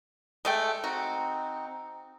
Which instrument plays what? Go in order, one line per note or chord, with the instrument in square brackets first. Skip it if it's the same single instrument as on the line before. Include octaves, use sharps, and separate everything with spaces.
[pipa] G#3 A3 G5
[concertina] C4 D#4 [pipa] F#4